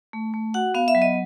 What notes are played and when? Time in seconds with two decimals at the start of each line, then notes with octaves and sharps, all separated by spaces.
0.13 A3
0.34 A3
0.54 F#4 F#5
0.74 B3 F5
0.88 E5
0.95 F#3
1.02 D#5